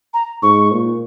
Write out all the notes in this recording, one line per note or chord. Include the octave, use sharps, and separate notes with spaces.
A#5
G#2 C#6
A#2